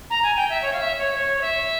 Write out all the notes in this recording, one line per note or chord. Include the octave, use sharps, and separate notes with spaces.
A#5
G#5
G5
E5
C#5
F5
E5
C#5
C#5
C#5
E5